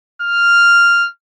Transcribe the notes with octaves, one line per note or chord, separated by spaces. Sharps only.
F6